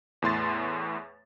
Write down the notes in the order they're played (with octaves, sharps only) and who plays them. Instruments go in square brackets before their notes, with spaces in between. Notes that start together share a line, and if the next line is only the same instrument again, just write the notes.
[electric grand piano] E2 A2 C6 A6